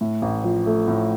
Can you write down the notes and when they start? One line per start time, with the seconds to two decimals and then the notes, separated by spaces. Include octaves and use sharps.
0.01 A2
0.22 A1
0.44 F3
0.66 A3
0.88 A2